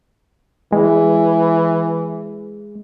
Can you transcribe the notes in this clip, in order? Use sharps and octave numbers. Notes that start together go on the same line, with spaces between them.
E3 G#3